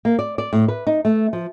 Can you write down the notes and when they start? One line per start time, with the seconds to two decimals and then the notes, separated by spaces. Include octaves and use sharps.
0.05 A#3
0.19 D5
0.38 D5
0.53 A2
0.68 B4
0.87 D#4
1.05 A3
1.33 F3